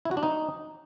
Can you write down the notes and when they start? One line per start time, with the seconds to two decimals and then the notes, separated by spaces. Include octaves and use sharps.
0.05 E4
0.11 F#4
0.17 D4
0.23 D#4